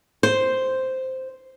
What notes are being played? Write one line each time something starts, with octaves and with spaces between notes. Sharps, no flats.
C5